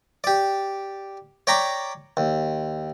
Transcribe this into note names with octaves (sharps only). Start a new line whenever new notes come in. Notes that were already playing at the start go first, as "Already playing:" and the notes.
G4 D5
C#5 D5 G5 A#5 B5 D6
D#2